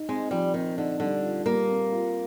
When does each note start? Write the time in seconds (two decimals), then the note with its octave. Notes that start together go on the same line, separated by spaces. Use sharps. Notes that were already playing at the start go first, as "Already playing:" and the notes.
Already playing: D#4
0.09 G#3 C4
0.31 F3 G3
0.54 D#3 C4
0.77 D3 D#4
1.00 D3 G3
1.23 F4
1.46 G3 A#3
1.69 C4
1.92 F4